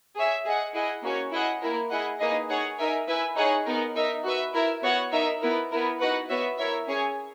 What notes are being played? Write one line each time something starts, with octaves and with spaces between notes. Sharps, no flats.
G#4 C#5 E5
G#4 D#5 F#5
E4 G#4 D#5 F#5
A#3 C#4 F#4 C#5
E4 G#4 D#5 F#5
A#3 E4 A#4
E4 G#4 D#5 F#5
A#3 D#4 G#4 B4 D#5
D#4 G#4 C#5 F#5
D#4 A#4 E5 G#5
E4 B4 E5 G#5
D#4 G#4 C#5 F#5
B3 D#4 A#4
D#4 A#4 E5
F#4 B4 E5
E4 A#4 E5
B3 F#4 C#5 F#5
D#4 A#4 E5
B3 E4 A#4
B3 E4 A#4
D#4 F#4 B4 F#5
B3 F#4 C#5 E5
E4 A#4 C#5 E5
C#4 G#4 C#5 G#5